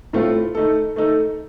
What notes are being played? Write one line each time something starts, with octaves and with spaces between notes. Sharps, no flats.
A2 A3 C4 F4
A3 D#4 A4
A3 D#4 A4